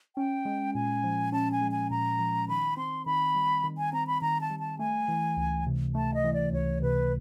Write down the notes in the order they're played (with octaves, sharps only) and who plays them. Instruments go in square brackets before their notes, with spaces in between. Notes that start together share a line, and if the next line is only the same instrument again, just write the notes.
[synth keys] C#4 [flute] G5
[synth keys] G#3
[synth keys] A#2 [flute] G#5
[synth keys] F3
[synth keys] C#4 [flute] A5
[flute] G#5
[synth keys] G#3
[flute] G#5
[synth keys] A#2 [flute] A#5
[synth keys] F3
[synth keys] D#3 [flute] B5
[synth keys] C4 [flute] C6
[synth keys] D#3 [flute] B5
[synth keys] G3
D#3
[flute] G#5
[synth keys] C4 [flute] A#5
[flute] B5
[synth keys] D#3 [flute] A#5
[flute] A5
[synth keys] G3
[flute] A5
[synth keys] A3 [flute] G#5
[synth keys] E3
C#2
C3
[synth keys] A3 [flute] A5
[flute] D#5
[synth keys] E3
[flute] D5
[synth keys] C#2 [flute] C#5
[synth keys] C3 [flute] B4